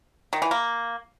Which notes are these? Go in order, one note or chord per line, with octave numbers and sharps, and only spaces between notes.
D#3
E3
A#3